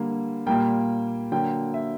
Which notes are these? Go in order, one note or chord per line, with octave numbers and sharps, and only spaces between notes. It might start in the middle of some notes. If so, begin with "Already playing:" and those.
Already playing: D3 G3 A#3
A#2 G3 A#3 G5
D3 F#3 A#3 G5
E5